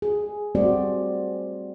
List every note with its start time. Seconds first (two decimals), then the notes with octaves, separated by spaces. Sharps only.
0.02 G#4
0.55 G3 A3 C4 F#4 C5 D5